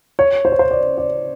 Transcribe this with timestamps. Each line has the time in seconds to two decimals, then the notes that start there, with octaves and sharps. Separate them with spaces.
0.19 C#5
0.45 C5
0.52 C#5
0.59 C5
0.71 D5
0.98 D5